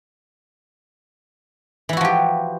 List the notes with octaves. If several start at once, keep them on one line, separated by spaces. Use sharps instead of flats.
E3 F3 E4 F#4 G4